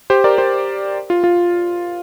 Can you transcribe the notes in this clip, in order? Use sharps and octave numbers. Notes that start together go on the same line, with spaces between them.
G4 C5
A#4 D5
G4 C5
F4
F4